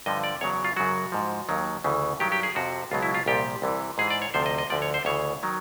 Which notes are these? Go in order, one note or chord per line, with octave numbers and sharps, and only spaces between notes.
G2 D3 F3 D#5
D5
E2 C#3 F#3 C#5
F4
F#2 C#3 F#3 F#4
G#2 F3
D#2 D#3 F#3
D2 C#3 E3
G2 D#3 F#3 G4
G4
G#4
F2 C3 F3 F#4
C#2 B2 F#3 F4
E4
F4
C2 A#2 F3 G4
C2 C3 E3
G#2 E3 G#4
D5
C#5
D2 C3 F3 C5
D#5
D#5
D2 D3 F3 D5
C#5
C5
D2 C#3 E3 C#5
D#3 F#3